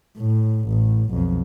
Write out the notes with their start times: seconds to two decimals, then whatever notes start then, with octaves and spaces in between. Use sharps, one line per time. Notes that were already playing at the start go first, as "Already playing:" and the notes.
0.18 A2
0.69 A1 A2
1.10 B1 F2